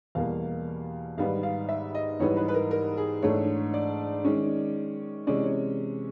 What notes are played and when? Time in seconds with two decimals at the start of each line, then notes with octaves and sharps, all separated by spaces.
0.15 E2 B2 G3 A#3 F5
1.17 G#2 D#3 G3 B3 F5
1.43 F5
1.69 E5
1.95 D#5
2.20 G#2 E3 G3 B3 D#4 C#5
2.37 B4
2.48 B4
2.54 A#4
2.71 A#4
2.97 G#4
3.22 G#2 E3 A3 D4 C#5
3.74 D5
4.25 D#3 G#3 C#4
5.27 C3 E3 G#3 C#4 D5
5.44 C#5